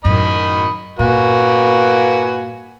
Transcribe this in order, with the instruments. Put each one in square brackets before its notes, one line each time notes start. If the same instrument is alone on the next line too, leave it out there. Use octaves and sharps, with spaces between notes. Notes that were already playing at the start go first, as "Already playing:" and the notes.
[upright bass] F#2 A2 [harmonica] D#3 D#5 B5
[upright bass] G2 A#2 [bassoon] A#3 [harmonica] F#4 B4 G#5